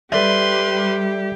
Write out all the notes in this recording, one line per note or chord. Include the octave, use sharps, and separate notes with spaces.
G3 G4 A4 B4 D5 E5 C6